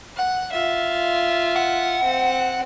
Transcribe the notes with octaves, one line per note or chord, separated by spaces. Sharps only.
F#5
F4 E5
F#5
C4